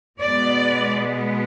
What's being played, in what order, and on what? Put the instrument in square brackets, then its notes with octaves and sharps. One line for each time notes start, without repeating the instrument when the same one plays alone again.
[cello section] B2 G#3 B3 D5